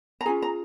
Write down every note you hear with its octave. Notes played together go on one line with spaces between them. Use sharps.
A#5
C#4 F4 G#4 G#5
A#5